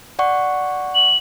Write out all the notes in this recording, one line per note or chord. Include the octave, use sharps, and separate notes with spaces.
D5 F#5 C#6
F#7